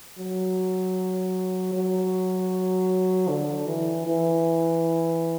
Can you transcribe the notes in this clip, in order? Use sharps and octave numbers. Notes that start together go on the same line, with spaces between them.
F#3
F#3
D3
E3
E3